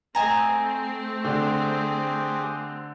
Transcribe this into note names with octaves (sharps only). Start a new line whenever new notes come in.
A3 C4 D#5 G#5 A#5
D3 G4 G#4 C5